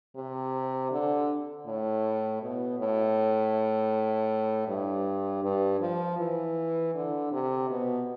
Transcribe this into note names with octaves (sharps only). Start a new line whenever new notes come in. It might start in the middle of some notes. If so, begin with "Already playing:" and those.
C3
D3
A2
B2
A2
G2
G2
F3
E3
D3
C3
B2